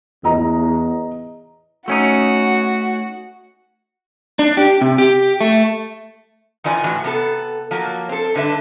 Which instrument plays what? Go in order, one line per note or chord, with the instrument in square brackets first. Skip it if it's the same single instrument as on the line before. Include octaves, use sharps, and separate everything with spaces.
[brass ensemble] E2 [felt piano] D#5 A#5
[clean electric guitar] A3 C#4 D#4 [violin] F#4
[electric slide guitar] D4
G4
C3
G4
A3
[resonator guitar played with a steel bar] D#3 E3 F4 D5 G#5
A2 E3 F#4
C3 B3 A4
F3 F#3 A#3
C4 A4
G2 D3 B4 E5